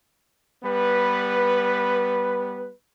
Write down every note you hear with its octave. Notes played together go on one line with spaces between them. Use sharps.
G3 B3 B4